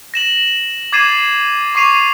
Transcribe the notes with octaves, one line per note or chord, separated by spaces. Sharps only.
A#6 E7 F#7
D6 G#6 A6 C7 D#7 E7
C#6 D6 C7 D#7 F7